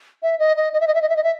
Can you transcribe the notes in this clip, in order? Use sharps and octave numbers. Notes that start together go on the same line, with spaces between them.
E5
D#5
D#5
D#5
E5
D#5
E5
D#5
E5
D#5
E5